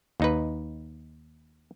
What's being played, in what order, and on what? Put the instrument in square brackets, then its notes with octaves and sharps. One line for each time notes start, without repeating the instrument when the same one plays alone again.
[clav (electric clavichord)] D#2 D#4 B4